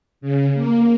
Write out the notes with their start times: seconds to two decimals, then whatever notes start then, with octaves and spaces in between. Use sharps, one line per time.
0.21 C#3
0.54 A#3